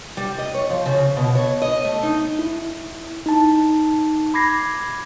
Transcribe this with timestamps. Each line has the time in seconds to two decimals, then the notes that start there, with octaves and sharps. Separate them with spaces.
0.17 G3
0.38 D#5
0.54 C#5
0.70 F3
0.85 C#3
1.17 B2
1.35 C#5
1.62 D#5
1.85 A3
2.03 D#4
2.39 E4
3.26 D#4 A5
4.34 B5 D6 G#6 A#6 C7